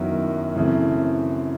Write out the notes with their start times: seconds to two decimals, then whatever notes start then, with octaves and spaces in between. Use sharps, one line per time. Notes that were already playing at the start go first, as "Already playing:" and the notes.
Already playing: F#2 D#3 F#3 B3 E4
0.55 F#2 C#3 E3 A3 C4